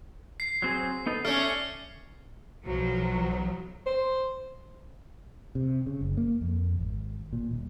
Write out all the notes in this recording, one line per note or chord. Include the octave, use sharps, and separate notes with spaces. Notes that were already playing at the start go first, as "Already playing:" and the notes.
C7
F#3 C4 G#4
B3 D#4 A4
A3 C#4 D5 F6
B1 F3 F#3
C5
C3
C#3
F#1
A#3
F2
G#1
A#2
D#1